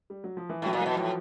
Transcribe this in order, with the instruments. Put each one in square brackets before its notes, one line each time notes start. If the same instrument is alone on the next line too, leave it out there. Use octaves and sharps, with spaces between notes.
[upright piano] G3
F#3
F3
E3
[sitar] A2 [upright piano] F#3
[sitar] A#2
[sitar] B2 [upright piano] E3
[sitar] A2 [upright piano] F3